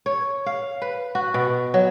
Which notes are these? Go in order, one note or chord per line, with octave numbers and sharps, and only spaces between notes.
C#5
F5
B4
F#4
B2
F#3